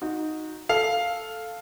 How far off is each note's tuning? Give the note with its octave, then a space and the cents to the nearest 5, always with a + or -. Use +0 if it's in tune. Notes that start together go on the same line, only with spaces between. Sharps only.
D#4 +0 F#4 -20
A4 +0 F5 +0